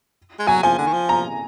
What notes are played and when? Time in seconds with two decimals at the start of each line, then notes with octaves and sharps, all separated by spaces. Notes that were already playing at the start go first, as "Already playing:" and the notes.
0.39 G#3
0.47 F#3 G#5
0.63 F3 G#5
0.78 D3
0.87 D#3
0.93 F3
1.09 A#5